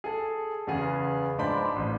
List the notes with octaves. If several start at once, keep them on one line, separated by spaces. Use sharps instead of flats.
G#4 A4
E2 C#3 B3 G#4
G#2 F3 D4 B5 G6
A1